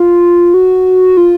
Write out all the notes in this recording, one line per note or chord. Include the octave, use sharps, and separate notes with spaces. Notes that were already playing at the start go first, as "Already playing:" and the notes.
Already playing: F4
F#4
F4